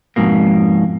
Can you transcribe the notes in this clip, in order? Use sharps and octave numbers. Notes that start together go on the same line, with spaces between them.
F2 G#2 B2 A#3